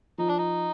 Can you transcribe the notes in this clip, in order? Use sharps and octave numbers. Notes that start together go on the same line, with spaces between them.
F3 D#4
D4
D#4